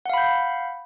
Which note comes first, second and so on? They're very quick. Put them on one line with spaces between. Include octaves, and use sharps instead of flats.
F#5 F5 B5 G6